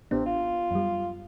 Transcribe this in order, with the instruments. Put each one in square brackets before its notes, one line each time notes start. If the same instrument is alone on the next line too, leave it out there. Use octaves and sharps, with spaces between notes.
[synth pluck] A1 B3 D4 [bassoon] C3
[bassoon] F4
[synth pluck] F#2 G3